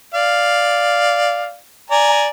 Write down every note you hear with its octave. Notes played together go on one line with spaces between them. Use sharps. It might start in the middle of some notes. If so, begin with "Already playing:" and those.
D5 F5
D5 G#5 A#5